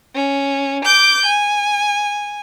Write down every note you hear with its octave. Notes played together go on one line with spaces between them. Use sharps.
C#4
D6 G6
G#5